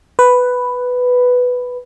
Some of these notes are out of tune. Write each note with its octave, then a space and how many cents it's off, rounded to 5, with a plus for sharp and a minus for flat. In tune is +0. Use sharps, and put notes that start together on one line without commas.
B4 +5